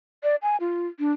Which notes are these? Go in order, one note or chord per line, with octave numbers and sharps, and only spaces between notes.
D5
G#5
F4
D4